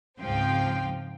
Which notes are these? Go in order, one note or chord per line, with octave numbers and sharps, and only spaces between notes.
C#2 G#2 F3 C4 F5 G5